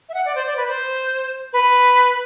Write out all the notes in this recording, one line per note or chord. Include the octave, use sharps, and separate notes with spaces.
E5
F#5
D5
C5
D5
B4
C5
B4